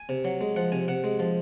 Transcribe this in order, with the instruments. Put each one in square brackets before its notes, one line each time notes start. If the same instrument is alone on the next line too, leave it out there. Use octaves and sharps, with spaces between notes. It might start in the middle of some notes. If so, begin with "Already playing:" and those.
Already playing: [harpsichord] G#5
C3
F#3
G#3
F3 F#5
C3 G#5
C3 F#5
G#3
F3